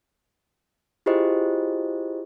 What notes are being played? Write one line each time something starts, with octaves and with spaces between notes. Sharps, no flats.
E4 F4 G4 G#4 C5 D#5